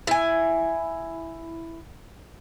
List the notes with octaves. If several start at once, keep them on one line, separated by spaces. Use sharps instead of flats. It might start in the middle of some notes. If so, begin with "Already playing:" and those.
E4 G#5